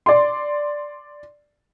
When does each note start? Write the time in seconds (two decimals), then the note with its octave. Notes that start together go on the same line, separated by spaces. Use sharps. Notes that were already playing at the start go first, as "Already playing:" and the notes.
0.06 D5 C6